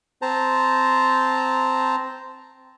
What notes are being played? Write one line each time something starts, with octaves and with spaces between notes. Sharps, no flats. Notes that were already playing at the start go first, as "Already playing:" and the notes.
C4 C5 A5 A#5